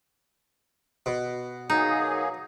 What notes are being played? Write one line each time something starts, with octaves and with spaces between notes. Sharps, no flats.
B2
F#3 A#3 D#4 G#4